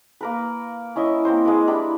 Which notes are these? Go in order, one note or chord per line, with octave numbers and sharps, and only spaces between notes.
A#3 A#4 B4
C#4 E4 D#5 E5
A#3 C4 A#4 C5
G#3 A#3 B4
G3 D4 E4 G5